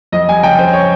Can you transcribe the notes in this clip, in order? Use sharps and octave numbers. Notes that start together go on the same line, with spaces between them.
F2 D#5
G3 G#5
C#3 G5
F2 C5
C#5